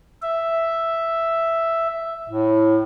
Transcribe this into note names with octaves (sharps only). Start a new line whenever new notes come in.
E5
A2